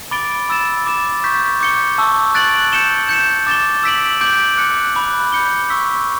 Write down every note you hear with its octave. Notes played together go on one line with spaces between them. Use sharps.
B5 D6 A6 D7 G7
B5 E6 A6 E7
D6 A6 E7
C#6 G6 B6
D6 G6 C#7 G7
A5 C#6 E6
F#6 A6 D7 F#7
G6 C#7 E7 G7
G6 C#7 E7
D6 A6 E7 G7
E6 B6 D7 F#7
D6 G6 D7 F#7
D6 F#6 C#7
B5 D6 F#6
G6 C#7 G7
C#6 E6 B6